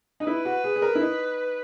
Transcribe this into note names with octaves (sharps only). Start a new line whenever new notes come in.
D#4
E4 B4
F#4
G#4
G#4
A#4
E4
D#4